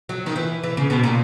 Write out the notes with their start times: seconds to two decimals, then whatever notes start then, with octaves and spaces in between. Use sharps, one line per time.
0.09 F#3
0.26 D#3
0.36 E3
0.63 E3
0.77 C#3
0.90 B2
1.03 A#2